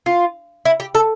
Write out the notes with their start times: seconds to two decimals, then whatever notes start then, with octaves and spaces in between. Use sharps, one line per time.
0.06 F4
0.65 E4
0.80 G4
0.95 A4